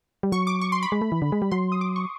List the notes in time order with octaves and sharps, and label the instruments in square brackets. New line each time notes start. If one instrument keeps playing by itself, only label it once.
[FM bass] G3
[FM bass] F#3 [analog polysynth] C#6
[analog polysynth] D6
C#6
C6
B5
[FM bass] G#3
A3
E3
D3
G#3
G3
[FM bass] F#3 [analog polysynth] C6
[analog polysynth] D#6
D6
C#6